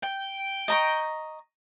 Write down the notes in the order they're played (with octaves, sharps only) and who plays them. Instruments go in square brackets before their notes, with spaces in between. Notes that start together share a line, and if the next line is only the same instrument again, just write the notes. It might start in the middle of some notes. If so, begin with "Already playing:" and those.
[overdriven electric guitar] G5
[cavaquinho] D#5 A#5 C#6